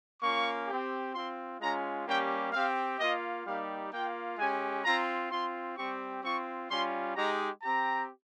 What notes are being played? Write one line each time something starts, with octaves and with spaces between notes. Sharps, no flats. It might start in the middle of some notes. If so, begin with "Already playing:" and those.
A#3 C#4 F4 C#6
C4 G4
C4 F4 C6
G#3 C#4 F4 A#5
G3 A#3 C#4 G4 G5
C4 G4 F5
A#3 F4 D#5
G3 A#3 D#4 G4 F5
A#3 F4 G5
G#3 C#4 G4 G#5
C4 F4 A#5
C4 F4 C6
G3 C4 G4 C#6
C4 F4 C#6
G3 C#4 F4 C6
G#3 D#4 G4 A#5
C4 G4 A#5